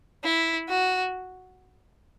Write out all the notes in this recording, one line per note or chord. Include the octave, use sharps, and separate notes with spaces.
E4
F#4